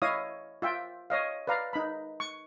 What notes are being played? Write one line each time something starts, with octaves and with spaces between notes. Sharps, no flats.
E4 C#5 D#5 F5 D#6
F4 E5 G5
C#5 D#5 F5
B4 D5 F5 A#5
D#4 B5
C#6